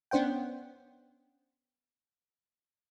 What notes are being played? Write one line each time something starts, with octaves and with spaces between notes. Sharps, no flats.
B3 C#4 D4 C5 F#5 G5